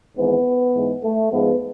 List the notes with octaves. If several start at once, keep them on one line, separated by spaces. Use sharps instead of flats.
G#1 G#2 E3 B3
G#2 E3 G#3
A3
G#2 F3 G#3 B3